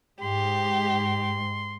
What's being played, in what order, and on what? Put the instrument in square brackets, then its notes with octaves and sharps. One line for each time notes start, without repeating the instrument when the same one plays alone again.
[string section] G#2 [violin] G4 [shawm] C6